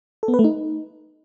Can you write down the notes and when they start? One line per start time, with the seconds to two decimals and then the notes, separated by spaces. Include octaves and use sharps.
0.23 A4
0.28 B3
0.34 B4
0.39 A3
0.44 D#4